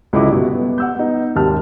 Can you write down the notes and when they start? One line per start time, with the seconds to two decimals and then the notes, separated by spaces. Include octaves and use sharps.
0.13 C#2 F#2 D3 E4 D#5 D6
0.28 G2 B2
0.48 B3
0.78 F#5 E6 G6
0.95 B3 D#4
1.36 G#1 D#2 C3 A5 F6